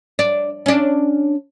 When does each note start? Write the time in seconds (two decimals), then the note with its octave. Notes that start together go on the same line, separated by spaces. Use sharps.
0.19 D4
0.66 C#4 D4